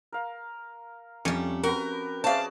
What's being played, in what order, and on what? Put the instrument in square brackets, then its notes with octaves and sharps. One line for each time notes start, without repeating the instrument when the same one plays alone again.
[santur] A#4 F5
[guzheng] F2 C#4 [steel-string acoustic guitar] G3 A3
[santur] F#4 G4 B4 [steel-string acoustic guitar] A#4 [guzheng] F#5
[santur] C#4 F#4 G#4 [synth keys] C5 E5 F5 [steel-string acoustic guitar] D5 A5